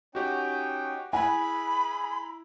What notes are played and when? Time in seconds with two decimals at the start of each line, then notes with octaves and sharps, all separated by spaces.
0.15 C#4 D#4 F#4 G4 F#5 G5
1.13 E4 G#4 G#5 B5